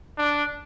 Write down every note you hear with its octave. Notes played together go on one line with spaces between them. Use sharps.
D4